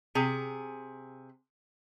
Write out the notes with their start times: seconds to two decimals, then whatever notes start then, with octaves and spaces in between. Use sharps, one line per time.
0.15 C3 G#4